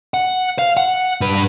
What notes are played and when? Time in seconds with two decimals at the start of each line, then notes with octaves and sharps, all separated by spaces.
0.14 F#5
0.59 F5
0.77 F#5
1.21 G2 B4